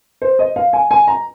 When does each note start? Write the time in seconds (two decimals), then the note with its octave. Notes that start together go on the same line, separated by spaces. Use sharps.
0.22 C5
0.39 D#5
0.56 F5
0.73 G#5
0.91 G#5
1.08 A#5